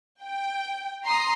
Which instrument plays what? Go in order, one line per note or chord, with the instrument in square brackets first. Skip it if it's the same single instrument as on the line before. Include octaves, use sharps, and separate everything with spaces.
[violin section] G5
A#5 C6 D#6